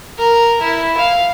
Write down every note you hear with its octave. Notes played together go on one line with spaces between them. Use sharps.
A#4
E4
F5